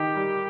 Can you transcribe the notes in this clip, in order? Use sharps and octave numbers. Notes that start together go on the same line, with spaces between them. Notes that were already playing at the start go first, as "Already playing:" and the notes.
Already playing: D#3 D#4 G4
G3